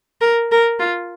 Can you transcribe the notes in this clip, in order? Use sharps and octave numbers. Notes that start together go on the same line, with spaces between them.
A#4
A#4
F4